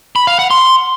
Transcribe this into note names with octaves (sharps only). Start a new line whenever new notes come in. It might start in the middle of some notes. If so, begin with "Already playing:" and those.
B5
F5
F#5
C6